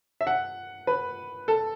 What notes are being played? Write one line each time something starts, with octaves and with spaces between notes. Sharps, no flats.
E5
F#5
B4
A4